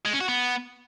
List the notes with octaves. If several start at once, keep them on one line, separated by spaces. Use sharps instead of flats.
G#3
C#4
F#4
B3